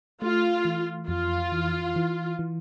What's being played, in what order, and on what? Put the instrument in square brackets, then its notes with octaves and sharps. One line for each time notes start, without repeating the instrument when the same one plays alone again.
[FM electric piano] A3 [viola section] F4
[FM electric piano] E3
[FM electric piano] F2 [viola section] F4
[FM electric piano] E3
E3
E3